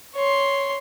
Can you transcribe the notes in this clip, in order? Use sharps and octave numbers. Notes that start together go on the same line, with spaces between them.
C#5 C6